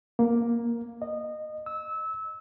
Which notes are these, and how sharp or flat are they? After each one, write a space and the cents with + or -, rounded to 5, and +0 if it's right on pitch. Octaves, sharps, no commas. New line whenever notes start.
A#3 +5
D#5 -20
E6 -20